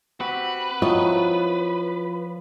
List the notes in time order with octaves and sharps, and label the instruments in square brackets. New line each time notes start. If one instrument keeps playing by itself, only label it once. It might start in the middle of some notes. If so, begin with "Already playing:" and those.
[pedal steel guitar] C4 F#4 G4 [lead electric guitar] B4
[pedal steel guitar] F3 C#6 [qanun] F#3 C4 E4 [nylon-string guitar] F4 D#5